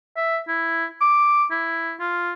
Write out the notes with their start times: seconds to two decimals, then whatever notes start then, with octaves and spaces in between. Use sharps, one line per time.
0.17 E5
0.48 E4
1.01 D6
1.51 E4
2.00 F4